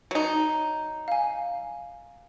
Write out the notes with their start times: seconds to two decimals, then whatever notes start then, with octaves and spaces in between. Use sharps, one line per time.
0.11 F#3 D#4
1.08 F5 G#5